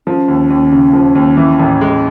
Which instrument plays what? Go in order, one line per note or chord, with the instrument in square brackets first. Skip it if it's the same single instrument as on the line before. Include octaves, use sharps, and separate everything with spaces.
[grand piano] F3 [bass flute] C#4
[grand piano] D#2
D#2
C#3
F3
D#2
E3
A1
G#3